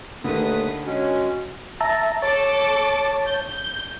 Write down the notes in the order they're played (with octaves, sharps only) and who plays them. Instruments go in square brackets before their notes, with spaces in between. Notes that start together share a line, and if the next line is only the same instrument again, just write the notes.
[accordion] D#2 B4 D#6 [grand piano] D3 D#3 [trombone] A3
[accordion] G#3 C#4 [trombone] F#4
[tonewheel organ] E5 A5 A#5
[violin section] A4 D6 [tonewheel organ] C#5 A5
[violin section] G6